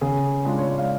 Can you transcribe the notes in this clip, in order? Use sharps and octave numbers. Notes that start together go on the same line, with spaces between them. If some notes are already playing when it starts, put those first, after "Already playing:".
C#3 G#4 G#5
G#3 D4 F4
C#5
D5
F5